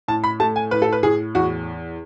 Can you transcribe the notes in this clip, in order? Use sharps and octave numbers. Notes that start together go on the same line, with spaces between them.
A2 A5
B5
A3 A5
G#5
A2 B4
A4
B4
A2 G#4
E2 F#4